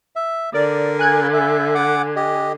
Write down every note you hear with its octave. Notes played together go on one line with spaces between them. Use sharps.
E5
D3 A#4 D5
G#5 F#6 G#6
E5
F#5 D6
G4 D#5